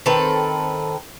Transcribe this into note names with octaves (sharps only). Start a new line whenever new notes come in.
D#3 C4 A4 B4